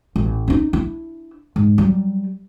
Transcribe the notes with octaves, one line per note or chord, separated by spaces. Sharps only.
A1
C#4 D#4
D4 E4
G#2
F#3 G3